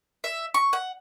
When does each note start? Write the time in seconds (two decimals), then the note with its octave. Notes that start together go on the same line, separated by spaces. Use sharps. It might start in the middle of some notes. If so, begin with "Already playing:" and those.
0.24 E5
0.54 C#6
0.73 F#5